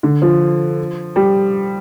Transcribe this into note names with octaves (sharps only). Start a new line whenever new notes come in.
D3
F3
G3